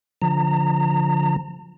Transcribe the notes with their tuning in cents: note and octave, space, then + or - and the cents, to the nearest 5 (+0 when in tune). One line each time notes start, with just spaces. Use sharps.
D3 -30 F3 +0 A#5 -35